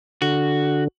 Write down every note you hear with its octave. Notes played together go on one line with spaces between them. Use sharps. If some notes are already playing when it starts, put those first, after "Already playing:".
D3 F#4